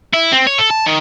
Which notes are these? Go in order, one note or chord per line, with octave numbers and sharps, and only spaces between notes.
E4
C4
C#5
A4
A5
D#3